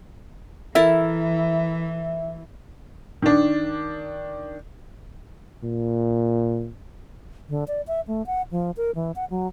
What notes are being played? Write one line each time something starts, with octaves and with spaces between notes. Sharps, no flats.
E3 E4 A4 A#4 E5
D#3 D4
A#2
D3
D5
E5
A3
F#5
F3
A#4
E3
F#5
F#3